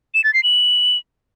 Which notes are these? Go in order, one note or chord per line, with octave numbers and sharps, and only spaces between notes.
E7
A6
C7
F#7